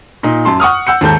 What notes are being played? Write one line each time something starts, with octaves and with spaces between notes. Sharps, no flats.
A#2 D#4
F#2 A5 C6
F#5 C#6 D#6 F6
F#5 E6 G6 C#7
D#2 G#2 A4 G6